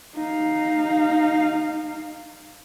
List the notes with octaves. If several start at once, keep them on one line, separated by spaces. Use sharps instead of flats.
D#4 F5